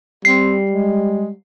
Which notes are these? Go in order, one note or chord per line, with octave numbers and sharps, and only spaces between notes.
G3 C4 C7
G#3